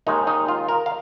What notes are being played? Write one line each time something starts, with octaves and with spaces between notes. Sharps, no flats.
D#2 D#3 G#3 D#4
D#4
F4
A#4
F5